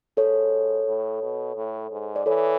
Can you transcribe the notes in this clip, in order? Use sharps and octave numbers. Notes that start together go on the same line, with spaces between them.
G#2 A4 C#5
A2
B2
A2
G#2
D5
E3 A4 C#5